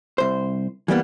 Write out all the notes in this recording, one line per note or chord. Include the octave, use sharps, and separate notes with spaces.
C2 C5
E3 G3 A#3 B3